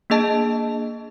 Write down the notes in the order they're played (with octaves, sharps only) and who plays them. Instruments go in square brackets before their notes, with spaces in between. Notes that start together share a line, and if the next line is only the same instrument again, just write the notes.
[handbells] A#3 D4 G#4 D#5 A5